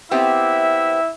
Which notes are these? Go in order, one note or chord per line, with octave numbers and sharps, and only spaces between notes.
B3 C4 E4 G4 E5